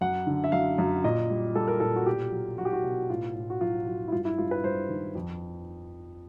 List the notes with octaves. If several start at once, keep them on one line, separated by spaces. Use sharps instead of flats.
F#2 F#5
D3
E5
F#2 F5
F#2
A#2 D#5
G3
G3 A4
A#4
A#2 A4
F#4
B2 G4
F#3
F#3 F#4
G4
F#4
B2
A2 F4
A2
F#4
F#3 F4
F#3
E4
G2 F4
E4
G2 F4
B4
G2 C5
D#3
F2